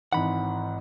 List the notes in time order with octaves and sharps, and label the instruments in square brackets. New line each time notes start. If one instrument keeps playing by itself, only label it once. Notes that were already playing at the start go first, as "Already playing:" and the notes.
[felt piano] G#1 G#2 E3 [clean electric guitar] F#5 B5